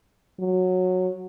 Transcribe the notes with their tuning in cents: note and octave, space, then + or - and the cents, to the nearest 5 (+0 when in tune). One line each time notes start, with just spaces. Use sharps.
F#3 -10